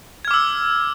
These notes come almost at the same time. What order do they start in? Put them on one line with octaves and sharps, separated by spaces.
G#6 F6 D6 E6